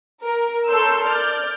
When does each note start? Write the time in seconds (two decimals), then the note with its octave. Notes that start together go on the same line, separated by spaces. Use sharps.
0.22 A#4
0.68 A4 A#4 C#5 C6 E6 G6
1.05 D5 F6 G6